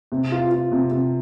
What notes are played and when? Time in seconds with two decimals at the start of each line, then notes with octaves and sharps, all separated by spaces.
0.12 C3
0.32 F4
0.51 F4
0.72 C3
0.91 C3